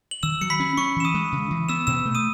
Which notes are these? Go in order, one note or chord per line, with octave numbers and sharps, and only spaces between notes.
F#7
D#3 E6 E7
F#3 C#7
B5 B6
C#4
C#4 C#6 C#7
E3 E7
D#6 D#7
G#3
C#3
E3
B3 E6 E7
B2 E6 E7
A3
D#6 D#7